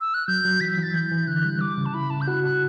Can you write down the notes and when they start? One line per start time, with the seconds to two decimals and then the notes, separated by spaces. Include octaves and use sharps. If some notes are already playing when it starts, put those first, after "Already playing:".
0.01 E6
0.14 F#6
0.27 F#3 G6
0.45 F#3
0.61 E3 B6
0.72 B6
0.77 E3
0.83 A6
0.94 E3 G6
1.11 E3
1.27 D3 F#6
1.45 G3
1.60 G3 D6
1.77 C#3
1.86 A5
1.94 E4 B5
2.10 C#3 A5
2.21 G6
2.28 F#4 F#6
2.44 F#4 F#6